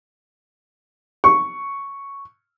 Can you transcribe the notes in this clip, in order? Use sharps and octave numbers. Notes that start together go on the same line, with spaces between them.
C#6